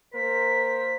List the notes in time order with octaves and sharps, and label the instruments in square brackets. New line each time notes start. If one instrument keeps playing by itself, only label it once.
[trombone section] A#3 A#4 C5 [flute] B6